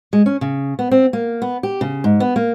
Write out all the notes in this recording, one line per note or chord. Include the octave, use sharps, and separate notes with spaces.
G#3
C#4
C#3
B3
C4
A#3
B3
G4
C#3
G#2
B3
A#3